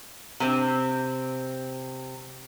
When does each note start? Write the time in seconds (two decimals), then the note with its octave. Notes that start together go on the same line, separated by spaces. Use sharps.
0.40 C3 C4